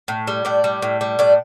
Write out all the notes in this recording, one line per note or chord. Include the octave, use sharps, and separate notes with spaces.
A2
G3
A2 D5
G3
A2
G3
A2 D5